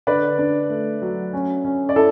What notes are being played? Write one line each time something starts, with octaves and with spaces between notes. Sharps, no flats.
D3 B4 D5
D4
A3
F#3
C#4
C#4
D5
E4 A4